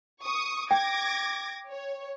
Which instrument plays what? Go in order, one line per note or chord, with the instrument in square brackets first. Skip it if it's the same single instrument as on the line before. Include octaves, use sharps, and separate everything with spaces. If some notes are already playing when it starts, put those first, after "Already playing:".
[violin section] C#6 D#6
[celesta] G5 [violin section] D6 G#6 A#6
[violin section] C#5